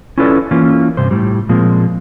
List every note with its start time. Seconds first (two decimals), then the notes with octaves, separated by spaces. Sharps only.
0.18 C#4 E4 F4 A4 B4 D5
0.51 E3 A#3 C#4 F4
0.97 G2 C3 C5
1.11 A2 G3
1.49 A#2 F3 G#3 A#3 C4